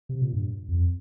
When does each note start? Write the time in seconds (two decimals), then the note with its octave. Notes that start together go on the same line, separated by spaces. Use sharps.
0.09 C3
0.22 A#2
0.33 G2
0.68 F2